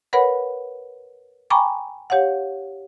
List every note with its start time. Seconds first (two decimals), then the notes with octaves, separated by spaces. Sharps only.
0.13 A#4 B4 C#5 F#5 B5
1.50 G5 G#5 A#5 B5 C#6 D6
2.10 G4 C#5 F5 F#5